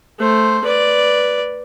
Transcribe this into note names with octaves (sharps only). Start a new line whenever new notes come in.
A3 C5
B4 D5